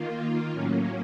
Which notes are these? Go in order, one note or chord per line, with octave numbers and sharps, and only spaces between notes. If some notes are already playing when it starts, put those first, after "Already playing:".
Already playing: D#3 A#3 F4
A2 F#3 A#3 C#4